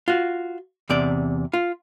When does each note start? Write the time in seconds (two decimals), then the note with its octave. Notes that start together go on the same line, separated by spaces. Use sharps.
0.08 F4 F#4
0.89 E2 C3 D5
1.53 F4